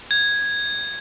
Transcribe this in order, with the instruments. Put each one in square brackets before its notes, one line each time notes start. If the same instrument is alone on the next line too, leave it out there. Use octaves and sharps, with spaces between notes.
[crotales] G#6